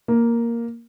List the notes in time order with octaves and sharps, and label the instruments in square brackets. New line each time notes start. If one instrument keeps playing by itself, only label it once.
[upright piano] A#3